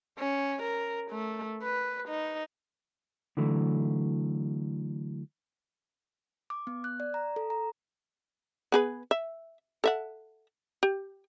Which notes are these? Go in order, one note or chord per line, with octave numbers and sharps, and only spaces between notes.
C#4
A#4
A3
B4
D#4
D3 E3 F#3 A3
D6
B3
F#6
D5
A#5
A4
A#5
B3 G#4 B4
E5
A4 E5 F#5
G4